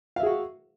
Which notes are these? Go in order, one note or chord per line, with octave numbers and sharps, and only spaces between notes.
F#4 G#4 E5 F5